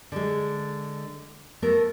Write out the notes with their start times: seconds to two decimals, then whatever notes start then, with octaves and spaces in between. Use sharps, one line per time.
0.12 D3 G#3
1.62 A3 B3 A4 A#4